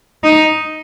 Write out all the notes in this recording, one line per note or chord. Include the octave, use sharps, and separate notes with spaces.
D#4